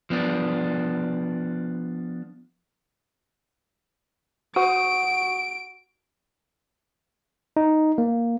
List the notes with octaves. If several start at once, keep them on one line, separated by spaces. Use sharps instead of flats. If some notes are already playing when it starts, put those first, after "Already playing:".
F3 B3 D4
F#4 F#5 C#6 D7
D#4
A#3